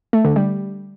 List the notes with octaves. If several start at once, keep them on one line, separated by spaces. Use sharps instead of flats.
A3
D3
G3